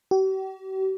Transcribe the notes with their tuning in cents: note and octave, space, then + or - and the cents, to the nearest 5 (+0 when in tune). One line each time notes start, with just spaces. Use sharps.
G4 -45